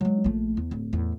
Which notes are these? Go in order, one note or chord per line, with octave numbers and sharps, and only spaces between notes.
F#3 G#3
A#1 A3
E2
D1
E2 A2